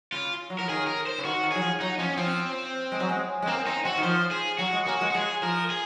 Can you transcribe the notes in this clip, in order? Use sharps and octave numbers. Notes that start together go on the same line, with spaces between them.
C#3 F4
F#3
F3 A#4
D#3 G#4
A#4
C5
C#3
D#3 F#4
D#3
F#3 G#4
F3
F#3 D#4
F3 C#4
F3 C4
G#3
F#3
G#3
G#3
A#3 C4
C4 D#4
C4 F#4
D#3
F3 C5
G#4
F#3 F#4
G#3
A#3 F#4
G#3
F#4
G#3 G#4
F3 A#4
G#4